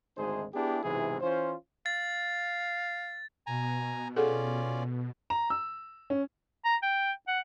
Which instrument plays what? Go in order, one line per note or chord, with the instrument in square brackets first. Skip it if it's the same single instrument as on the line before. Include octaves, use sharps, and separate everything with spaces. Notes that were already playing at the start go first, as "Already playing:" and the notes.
[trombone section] G#1 D2 G#3 D#4 G#4 C5
B3 D4 E4 G4 G#4
B1 G#2 C3 E3 E4 G#4
E3 C#4 F4 C5
[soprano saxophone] F5 [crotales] A6
[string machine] B2 [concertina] G#5 A#5
[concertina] C#4 F4 D5 [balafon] G#4 A4 F#5
[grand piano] A#5
E6
C#4
[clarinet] A#5
G5
F#5